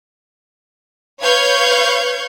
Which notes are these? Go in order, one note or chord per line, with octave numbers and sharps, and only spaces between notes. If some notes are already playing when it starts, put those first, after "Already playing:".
B4 C#5 F5 C#6 G6 G#6